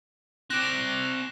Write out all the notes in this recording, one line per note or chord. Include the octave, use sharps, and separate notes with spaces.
C4 D5 F#6 A#6 E7